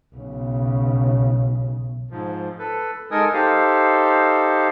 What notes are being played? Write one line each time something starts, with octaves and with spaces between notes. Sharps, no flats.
B1 C#3
G#2 F3
A4 B4
G#3 D#4 A4 A#4 G#5 D#6
D#4 G4 A4 C5 F5